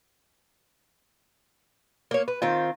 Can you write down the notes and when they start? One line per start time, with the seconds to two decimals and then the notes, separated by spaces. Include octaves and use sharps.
2.11 A#3 C#5
2.28 B4
2.42 D#3 C4 F4